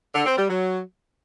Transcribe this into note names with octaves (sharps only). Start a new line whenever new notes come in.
D3
C4
G3
F#3